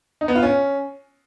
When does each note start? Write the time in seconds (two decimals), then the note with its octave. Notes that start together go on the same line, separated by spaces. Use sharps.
0.21 D#4
0.28 B3
0.35 F4
0.43 C#4